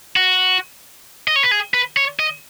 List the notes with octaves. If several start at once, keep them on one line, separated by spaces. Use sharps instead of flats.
F#4
D#5
C#5
B4
G#4
B4
C#5
D#5